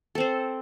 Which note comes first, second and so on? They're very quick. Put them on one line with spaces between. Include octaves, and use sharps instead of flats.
A4 C4 C5